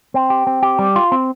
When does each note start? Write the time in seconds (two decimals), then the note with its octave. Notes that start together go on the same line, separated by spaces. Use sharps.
0.14 C4
0.30 G4
0.47 C4
0.63 G4
0.79 G3
0.96 F4
1.12 C4